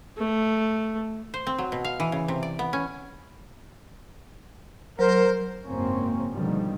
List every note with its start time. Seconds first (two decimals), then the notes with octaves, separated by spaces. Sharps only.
0.17 A3
1.34 C5
1.47 C4
1.58 F#3
1.72 B2
1.84 F5
2.00 E3
2.12 C#3
2.28 C3
2.43 D5
2.59 B3
2.73 C#4
4.99 F#3 A#4 C5
5.66 F#1 G#2 A#3 C4 C#4
6.32 G#2 B2 D3 D#3 F3 G3